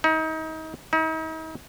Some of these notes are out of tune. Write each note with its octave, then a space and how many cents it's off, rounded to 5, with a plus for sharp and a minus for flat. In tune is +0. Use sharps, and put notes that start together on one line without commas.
D#4 +30
D#4 +40